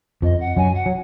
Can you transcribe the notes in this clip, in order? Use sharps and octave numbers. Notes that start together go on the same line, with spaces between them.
F2 F3 D#5
F#5
F#2 F#3 G#5
F#5
F#3